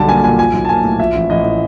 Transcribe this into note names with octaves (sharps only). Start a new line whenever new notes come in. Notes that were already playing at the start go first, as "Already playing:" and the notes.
Already playing: B1 D3 G3 A5
A#3 G#5
A#2 G#5
F3 G#5
B1
A5
A#3 G#5
A2
F3 E5
A1
A1 D#5
A2